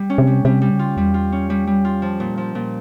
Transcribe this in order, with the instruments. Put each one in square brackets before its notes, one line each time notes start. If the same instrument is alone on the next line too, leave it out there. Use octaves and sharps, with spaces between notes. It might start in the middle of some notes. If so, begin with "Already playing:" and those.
Already playing: [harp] G3
C#4
[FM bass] C3
[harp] G3
[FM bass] C3 [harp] G3
[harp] G3
[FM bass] C#3
[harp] F4
[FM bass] E2 [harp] G3
[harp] F4
C#4
G3
G3
F4
[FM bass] F2 [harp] F3
[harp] A#2
F3
A#2